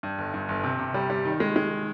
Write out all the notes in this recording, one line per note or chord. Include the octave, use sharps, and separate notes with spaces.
G2
G1
G2
G1
C3
C3
G3
G3
D#3
G#3
G#3